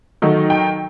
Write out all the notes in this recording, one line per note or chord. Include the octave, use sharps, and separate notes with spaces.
D#3 F#3 A3 D#4
G5